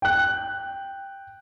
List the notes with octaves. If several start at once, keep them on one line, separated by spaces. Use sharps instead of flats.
G5 F#6